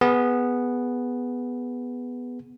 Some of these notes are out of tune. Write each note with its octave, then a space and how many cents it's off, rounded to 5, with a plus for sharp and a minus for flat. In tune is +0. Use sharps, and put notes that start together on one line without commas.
B3 +0 G#4 +0